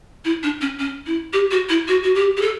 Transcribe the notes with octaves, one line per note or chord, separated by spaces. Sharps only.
E4
D4
C#4
C#4
E4
G4
F#4
E4
F#4
F#4
G4
G4
A4